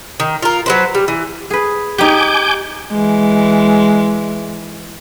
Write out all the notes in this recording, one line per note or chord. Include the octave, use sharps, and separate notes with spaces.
D#3
F4 A#4
F#3 B4 C5
G3
E3
G#4 B4
D#4 G4 G#5 D6 G6
E3 G#3